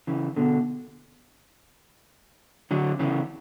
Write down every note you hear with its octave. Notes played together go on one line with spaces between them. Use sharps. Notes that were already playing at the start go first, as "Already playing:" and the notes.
C#3 E3
B2 D3
D3 F#3
C#3 E3